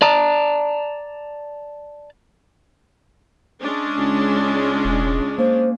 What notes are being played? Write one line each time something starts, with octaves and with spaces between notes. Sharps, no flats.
D5 A5 A#5
G#3 C#4 D4
C#2
E1
A#3 C5